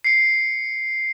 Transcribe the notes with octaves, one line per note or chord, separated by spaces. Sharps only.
C7 C#7